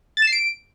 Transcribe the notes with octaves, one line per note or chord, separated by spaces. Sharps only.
A6
E7
C7
D7